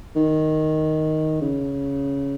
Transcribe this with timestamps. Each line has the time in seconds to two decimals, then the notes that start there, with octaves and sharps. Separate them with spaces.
0.16 D#3
1.41 C#3